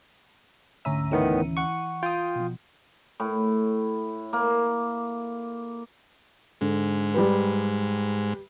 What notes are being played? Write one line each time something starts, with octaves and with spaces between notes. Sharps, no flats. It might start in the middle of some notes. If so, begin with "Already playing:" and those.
D2 G#2 C#4 E5 A#5 D#7
A2 D#3 E3 B3 C#7 D#7
F#5 C#6
F4 G5 D#6
B2 F3
A2
A#3
G#2 D3
G3 G4 B4